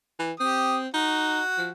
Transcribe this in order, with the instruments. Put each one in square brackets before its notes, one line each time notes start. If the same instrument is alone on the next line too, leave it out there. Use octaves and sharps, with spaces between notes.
[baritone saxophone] E3
[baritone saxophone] C4 [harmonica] G4 D#6
[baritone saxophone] D#4 [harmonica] F#4
[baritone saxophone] F3